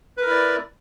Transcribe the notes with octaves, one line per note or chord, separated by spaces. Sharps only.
E4 A#4 B4 D5